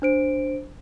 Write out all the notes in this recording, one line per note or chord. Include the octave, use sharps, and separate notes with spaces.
D4 C5 D7